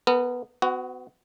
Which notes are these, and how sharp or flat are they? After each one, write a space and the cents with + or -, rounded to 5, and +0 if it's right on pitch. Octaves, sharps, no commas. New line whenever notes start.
B3 +0 A#4 -35
B3 +40 F#4 +0